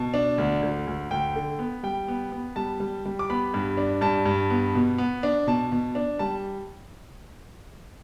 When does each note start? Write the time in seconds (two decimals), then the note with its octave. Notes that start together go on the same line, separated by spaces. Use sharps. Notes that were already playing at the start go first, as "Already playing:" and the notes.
Already playing: B2 A5
0.14 D4
0.38 D2
0.62 D2
0.87 D2
1.10 D2 G5
1.36 D3
1.59 B3
1.83 G3 G5
2.08 B3
2.32 B3
2.56 G3 A5
2.80 G3
3.06 G3
3.19 D6
3.30 B3 B5
3.54 G2
3.77 D4
4.01 G2 A5
4.26 G2
4.50 B3
4.75 B2
4.98 B3
5.23 D4
5.47 B2 A5
5.72 B2
5.95 D4
6.19 G3 A5